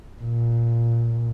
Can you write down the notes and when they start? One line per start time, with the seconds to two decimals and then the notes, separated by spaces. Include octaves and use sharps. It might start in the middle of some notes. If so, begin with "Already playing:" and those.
0.22 A#2